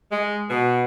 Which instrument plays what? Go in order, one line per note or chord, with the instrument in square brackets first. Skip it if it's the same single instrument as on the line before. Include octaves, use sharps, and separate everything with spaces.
[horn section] G#3
B2